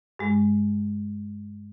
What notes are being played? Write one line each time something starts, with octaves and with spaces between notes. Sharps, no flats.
G2 G#3